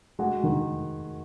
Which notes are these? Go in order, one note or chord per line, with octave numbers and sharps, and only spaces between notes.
G#3 F#4
D#3